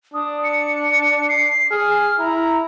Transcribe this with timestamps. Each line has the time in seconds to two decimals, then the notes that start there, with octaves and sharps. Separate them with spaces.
0.14 D4 D#6
0.44 C#7
1.29 C7
1.71 G#4 F6
2.19 E4 A#5